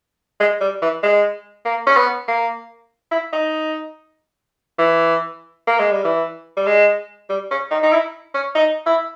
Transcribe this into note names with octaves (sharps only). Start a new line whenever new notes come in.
G#3
G3
E3
G#3
A#3
C#4
B3
A#3
E4
D#4
E3
A#3
G#3
G3
E3
G3
G#3
G3
C#4
D#4
D#4
E4
C#4
D#4
E4